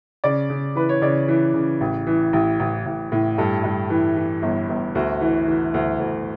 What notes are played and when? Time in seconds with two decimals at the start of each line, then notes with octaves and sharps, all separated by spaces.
0.24 C#3 D5
0.50 C#3
0.75 E3 B4
0.89 C#5
1.02 C#3 D5
1.28 E3
1.54 C#3
1.81 A1
2.07 E3
2.33 A1
2.60 A1
2.86 A1
3.12 A2
3.38 G2 A4
3.64 G2
3.90 E3
4.16 E3
4.42 G1
4.69 G1
4.95 D2 F#4
5.21 E3
5.48 E3
5.74 D2
5.99 D2